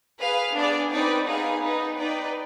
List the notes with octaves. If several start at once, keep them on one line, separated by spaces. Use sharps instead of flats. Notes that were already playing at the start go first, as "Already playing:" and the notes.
G#4 B4 F5
B3 D4 G#4 D5
C4 D#4 B4 D5 G5
B3 D#4 G#4 B4 F5
B3 D#4 B4
D#4 B4 D5 G5